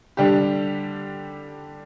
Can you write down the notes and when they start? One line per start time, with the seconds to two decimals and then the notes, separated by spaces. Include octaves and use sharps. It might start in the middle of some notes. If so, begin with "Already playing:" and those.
0.17 D3 G3 D4 G4